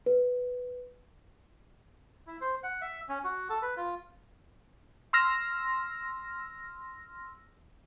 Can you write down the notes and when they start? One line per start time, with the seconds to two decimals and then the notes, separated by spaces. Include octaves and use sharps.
0.06 B4
2.27 E4
2.41 C5
2.63 F#5
2.82 E5
3.09 C#4
3.24 F#4
3.50 A4
3.62 B4
3.77 F4
5.13 C6 E6 F6 A#6